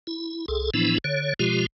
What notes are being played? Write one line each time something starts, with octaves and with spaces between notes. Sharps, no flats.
E4
C2 G#4 A4
A2 E3 F3 B3 D4 E4
D3 C#5
B2 F3 G#3 F4 G4